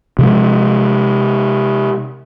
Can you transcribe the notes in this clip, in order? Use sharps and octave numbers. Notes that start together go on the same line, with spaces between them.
C3 F3 G#3